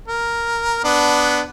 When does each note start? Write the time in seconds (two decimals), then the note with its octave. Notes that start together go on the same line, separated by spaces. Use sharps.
0.08 A#4
0.84 B3 D4